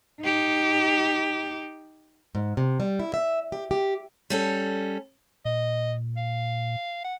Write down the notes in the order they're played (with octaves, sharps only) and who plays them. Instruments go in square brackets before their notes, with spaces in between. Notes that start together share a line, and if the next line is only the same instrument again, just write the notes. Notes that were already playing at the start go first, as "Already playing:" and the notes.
[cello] D#4 G4
[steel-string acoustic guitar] G#2
C3
G3
E4
E5
G4
G4
G3 C#4 A4
[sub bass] A#2 [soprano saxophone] D#5
[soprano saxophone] F5
F#5